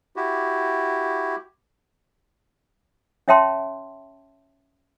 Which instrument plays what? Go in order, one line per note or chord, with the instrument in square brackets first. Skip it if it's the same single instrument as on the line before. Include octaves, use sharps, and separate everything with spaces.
[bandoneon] E4 F#4 G4
[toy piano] C#4 C#5 E5 G5 A5 C6